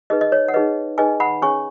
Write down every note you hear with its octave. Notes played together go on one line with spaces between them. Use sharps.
D#4 G#4 B4 D#5
D#5
C#5
F#5
D#4 G#4 B4 D#5
D#4 G#4 B4 D#5 G#5
F#5 B5
C#4 G#4 C#5 G#5 C#6